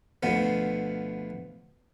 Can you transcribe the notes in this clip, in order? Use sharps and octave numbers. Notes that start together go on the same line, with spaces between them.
D2 B2 F3 B3